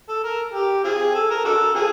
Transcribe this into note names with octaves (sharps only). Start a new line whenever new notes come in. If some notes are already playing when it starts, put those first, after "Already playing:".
A4
A#4
G4
C4 F4 G#4
A4
A#4
D4 F#4 A4
C4 F4 G#4